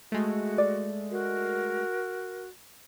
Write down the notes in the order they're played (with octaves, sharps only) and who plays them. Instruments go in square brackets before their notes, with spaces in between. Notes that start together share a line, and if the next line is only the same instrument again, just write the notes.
[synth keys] G#3 A3 [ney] F#4
[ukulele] D5
[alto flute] F#4 [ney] A#4